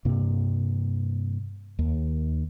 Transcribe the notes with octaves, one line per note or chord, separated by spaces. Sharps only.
G2 C3 A#3
D#2